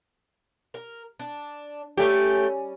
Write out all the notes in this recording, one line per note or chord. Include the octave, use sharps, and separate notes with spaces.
A#4
D4
G3 A3 C#4 G4 G#5